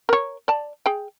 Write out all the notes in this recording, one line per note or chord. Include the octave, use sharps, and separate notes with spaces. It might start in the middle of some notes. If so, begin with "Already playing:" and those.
A#4 C#5
D5 A5
G#4 G5